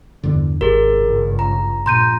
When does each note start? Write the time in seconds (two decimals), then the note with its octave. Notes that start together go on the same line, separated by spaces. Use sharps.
0.23 E2 G2 D3
0.61 G#1 G4 G#4 A#4
0.92 C#2 G2
1.39 A#5
1.86 A#1 A#5 C6 G6 D#7